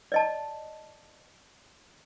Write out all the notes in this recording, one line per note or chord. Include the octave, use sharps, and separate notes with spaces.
D5 D#5 A5